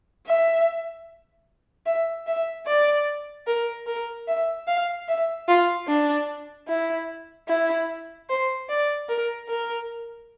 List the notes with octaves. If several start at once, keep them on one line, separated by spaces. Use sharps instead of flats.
E5
E5
E5
D5
A#4
A#4
E5
F5
E5
F4
D4
E4
E4
C5
D5
A#4
A#4